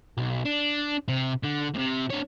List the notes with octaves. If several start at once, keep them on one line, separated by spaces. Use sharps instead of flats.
B1
D4
C3
D3
A2 C3
D4 C#5